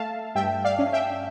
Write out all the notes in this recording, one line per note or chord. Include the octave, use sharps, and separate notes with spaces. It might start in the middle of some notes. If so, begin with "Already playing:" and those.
Already playing: A3 E5 F5 A5
G2 E5 G5
D5 F5
C#4
E5 G5